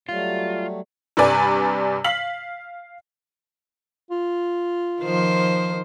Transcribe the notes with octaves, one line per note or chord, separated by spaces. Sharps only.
F#3 G3 A3 F4
G2 C3 G3 B4 D5 G#5
F5 B6 F#7
F4
D#3 F3 C5